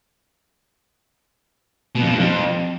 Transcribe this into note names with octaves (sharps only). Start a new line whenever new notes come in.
B2
F2
B2
G2
F2